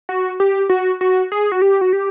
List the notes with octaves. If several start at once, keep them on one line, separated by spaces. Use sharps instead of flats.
F#4
G4
F#4
F#4
G#4
F#4
G4
F#4
G4